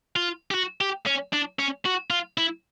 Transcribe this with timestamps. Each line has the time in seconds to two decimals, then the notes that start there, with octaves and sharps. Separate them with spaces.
0.16 F4
0.51 G4
0.54 F#4
0.81 G4
1.06 C#4
1.33 D4
1.59 C#4
1.85 F#4
2.10 F4
2.38 E4